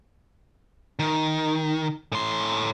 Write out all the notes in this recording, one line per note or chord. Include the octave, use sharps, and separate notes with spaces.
D#3
A2 C6